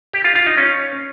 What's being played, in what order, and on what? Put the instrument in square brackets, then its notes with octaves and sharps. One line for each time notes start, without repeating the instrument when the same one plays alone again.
[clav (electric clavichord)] G4
F4
F4
D#4
C#4